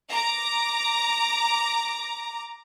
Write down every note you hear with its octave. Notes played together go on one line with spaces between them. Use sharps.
A#5 D6